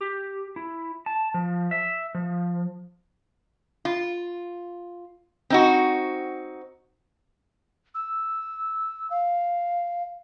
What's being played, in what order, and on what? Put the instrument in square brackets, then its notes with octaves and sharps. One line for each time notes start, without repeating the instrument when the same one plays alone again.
[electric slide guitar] G4
E4
A5
F3
E5
F3
[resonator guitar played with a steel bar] F4
C4 D#4 F#4
[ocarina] E6
F5